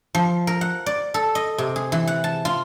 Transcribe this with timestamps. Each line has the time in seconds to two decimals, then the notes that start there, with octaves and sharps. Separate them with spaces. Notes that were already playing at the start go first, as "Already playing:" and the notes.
0.15 F3
0.47 A#4
0.61 F#5
0.86 D5
1.14 A4
1.35 D#5
1.58 C3
1.76 G#4
1.92 E3
2.07 F#5
2.24 A5
2.45 F4